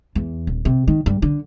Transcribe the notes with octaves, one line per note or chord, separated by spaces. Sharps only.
E2
D#1
C3
D#3
G2
D3